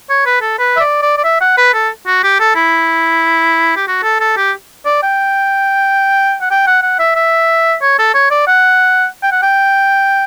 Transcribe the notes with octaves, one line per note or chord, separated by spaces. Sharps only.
C#5
B4
A4
B4
E5
D5
D5
D5
E5
F#5
B4
A4
F#4
G4
A4
E4
G4
F#4
A4
A4
G4
D5
G5
F#5
G5
F#5
F#5
E5
E5
C#5
A4
C#5
D5
F#5
G5
F#5
G5